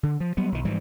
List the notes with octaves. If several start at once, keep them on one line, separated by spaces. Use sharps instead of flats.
D3
F3
F#3 G3 B3
B1 D#3
G#2 E3 F3 G3